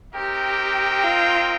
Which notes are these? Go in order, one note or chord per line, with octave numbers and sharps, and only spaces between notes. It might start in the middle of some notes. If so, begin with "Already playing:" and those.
C4 D#4 G4 A#4 G5
F4